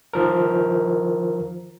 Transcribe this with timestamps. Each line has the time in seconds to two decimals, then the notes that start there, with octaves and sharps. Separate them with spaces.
0.13 D#3 F3 A#4